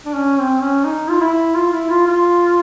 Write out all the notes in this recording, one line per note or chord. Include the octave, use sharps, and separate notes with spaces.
D4
C#4
C4
C#4
D#4
F4
E4
F4
E4
F4
F4